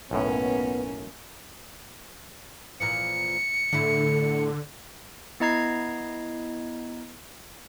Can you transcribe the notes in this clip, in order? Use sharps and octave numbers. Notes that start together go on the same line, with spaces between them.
B1 F#2 A2 A#3 B3 C#4
A#2 E3 F3 C#7
A2 D3 A3 E4
B3 E4 D#5 A#5 G#6 C7